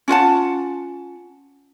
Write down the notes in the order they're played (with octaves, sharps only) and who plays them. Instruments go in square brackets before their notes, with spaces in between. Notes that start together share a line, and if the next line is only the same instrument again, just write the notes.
[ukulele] C#4 F4 F#5 A5